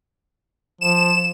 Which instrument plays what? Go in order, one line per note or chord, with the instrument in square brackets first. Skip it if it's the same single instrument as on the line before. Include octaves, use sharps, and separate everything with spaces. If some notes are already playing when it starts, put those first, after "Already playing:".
[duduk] F3 [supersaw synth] E7